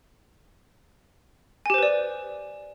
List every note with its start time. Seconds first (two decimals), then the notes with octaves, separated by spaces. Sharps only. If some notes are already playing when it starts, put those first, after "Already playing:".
1.66 G#5
1.70 G4
1.74 C5
1.78 B4
1.83 D5